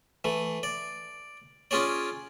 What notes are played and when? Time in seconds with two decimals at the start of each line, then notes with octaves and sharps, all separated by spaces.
0.24 E3 A3
0.63 D5
1.71 C#4 F4 G#4 C#5 D5